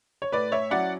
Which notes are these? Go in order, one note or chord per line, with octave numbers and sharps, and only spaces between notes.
C#5
A2 B4 D5
C#5 E5
F#3 C#4 E4 D5 F#5